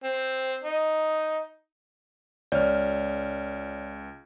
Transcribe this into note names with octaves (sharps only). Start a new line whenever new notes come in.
C4
D#4
C#2 C#5 D5 F6